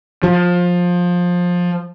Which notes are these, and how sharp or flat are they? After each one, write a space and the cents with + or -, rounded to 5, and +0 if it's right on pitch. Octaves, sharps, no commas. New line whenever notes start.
F3 +20